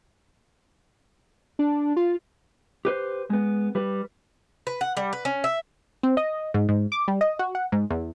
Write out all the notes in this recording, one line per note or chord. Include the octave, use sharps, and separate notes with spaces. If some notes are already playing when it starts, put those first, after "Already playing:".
D4
F4
G4 B4 C5
G#3 B3
G3 B4
B4
F#5
G3
B4
C#4
E5
C4
D#5
G#2
G#2
D6
G3
D#5
F#4
F#5
G#2
E2